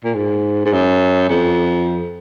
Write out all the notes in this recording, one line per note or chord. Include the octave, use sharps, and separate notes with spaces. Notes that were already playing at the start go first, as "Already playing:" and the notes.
A#2
G#2
G#2
F#2
F2